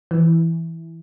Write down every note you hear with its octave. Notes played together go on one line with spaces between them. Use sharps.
E3